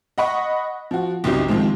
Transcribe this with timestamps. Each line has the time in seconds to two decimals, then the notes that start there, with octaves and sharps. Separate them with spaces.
0.18 D#5 F#5 B5 C#6
0.91 F3 F#4
1.24 F#1 C2 F#3 D#4 G4
1.48 C3 D#3 F3 G#3 C4